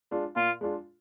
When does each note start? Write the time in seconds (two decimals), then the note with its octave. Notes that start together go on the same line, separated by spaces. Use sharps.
0.11 G#3 D4 F4
0.36 A#2 F4
0.61 G#3 D4 F4